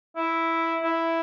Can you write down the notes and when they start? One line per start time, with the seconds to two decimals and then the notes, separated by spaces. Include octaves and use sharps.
0.16 E4
0.83 E4